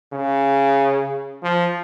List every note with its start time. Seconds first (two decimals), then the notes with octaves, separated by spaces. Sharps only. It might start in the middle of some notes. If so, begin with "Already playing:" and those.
0.13 C#3
1.43 F3